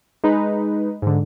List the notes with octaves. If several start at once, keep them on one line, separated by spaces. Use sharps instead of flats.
G#3 D#4 B4
G#2 D3